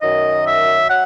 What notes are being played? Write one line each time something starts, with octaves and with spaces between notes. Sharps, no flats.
F#2 D#3 F#3 D#5
E5
F#3 F#5